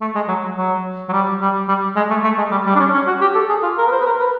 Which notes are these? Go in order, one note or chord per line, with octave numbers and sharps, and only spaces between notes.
A3
G#3
F#3
F#3
F#3
G3
G3
G3
G#3
A3
A3
G#3
G3
G3
D4
C#4
C#4
F#4
G4
A4
G#4
F4
A#4
B4
C5
B4
A#4
B4